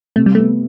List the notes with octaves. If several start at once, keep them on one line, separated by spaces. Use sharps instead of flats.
C3 A3
G3
A3 B3